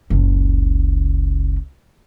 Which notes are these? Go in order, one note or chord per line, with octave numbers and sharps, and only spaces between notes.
F#1 C#2